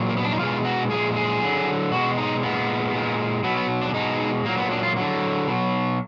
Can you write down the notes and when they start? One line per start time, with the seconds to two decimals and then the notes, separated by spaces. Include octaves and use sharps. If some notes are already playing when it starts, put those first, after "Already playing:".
Already playing: A#2 F#3
0.09 A#3
0.17 B3
0.24 D4
0.33 D#4
0.40 B2 G#3 F4
0.65 F#4
0.91 A#2 F3 G#3 G#4
1.16 G#4
1.42 D3 F#3
1.91 B2 G#3 F#4
2.18 D#4
2.43 A#2 G#3 B3
2.93 A#2 G#3
3.43 B2 F#3 B3
3.57 B3
3.81 D4
3.94 B2 G#3 D#4
4.45 A#2 F#3 A#3
4.58 B3
4.71 D4
4.83 F4
4.97 D3 F#3
5.47 B2 F#3